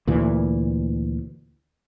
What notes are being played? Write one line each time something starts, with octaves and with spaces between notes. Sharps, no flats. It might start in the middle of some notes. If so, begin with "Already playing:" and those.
D2 A#2 E3